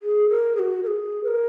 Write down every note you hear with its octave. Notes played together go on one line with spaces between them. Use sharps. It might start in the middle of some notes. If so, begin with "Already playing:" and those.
G#4
A#4
G#4
F#4
A#4
G#4
B4
A#4